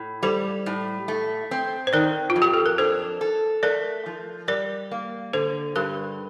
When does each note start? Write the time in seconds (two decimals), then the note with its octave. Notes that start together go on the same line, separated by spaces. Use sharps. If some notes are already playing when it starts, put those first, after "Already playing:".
Already playing: A2
0.23 G3 A4 C5
0.66 A2
1.08 A3
1.51 C4
1.87 C5
1.93 D#3 A#4 D5
2.30 F4
2.36 F2
2.42 G4
2.54 A4
2.66 A#4
2.78 D4 A4 C5
3.21 A4
3.63 A3 A#4 D5
4.06 F3
4.48 G3 A#4 D5
4.91 A#3
5.33 D3 A4 C5
5.75 G2 G4 A#4